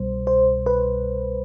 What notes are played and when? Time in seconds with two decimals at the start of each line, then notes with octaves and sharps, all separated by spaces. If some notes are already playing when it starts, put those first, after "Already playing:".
Already playing: C2 B2 G3 C5
0.27 C5
0.66 B4